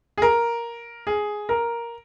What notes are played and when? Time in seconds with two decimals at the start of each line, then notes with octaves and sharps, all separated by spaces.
0.18 G#4
0.22 A#4
1.07 G#4
1.49 A#4